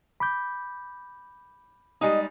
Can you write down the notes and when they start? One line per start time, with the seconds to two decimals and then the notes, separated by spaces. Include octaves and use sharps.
0.20 B5 D6 G6
2.01 G3 G#3 D#4 D#5